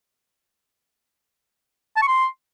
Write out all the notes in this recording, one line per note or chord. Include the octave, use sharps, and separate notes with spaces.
A5
C#6
C6